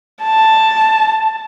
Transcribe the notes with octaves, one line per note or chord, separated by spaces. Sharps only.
A5